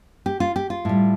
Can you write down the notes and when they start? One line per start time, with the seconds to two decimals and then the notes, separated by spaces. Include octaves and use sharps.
0.26 G4
0.40 F4
0.56 G4
0.70 F4
0.85 A2 G3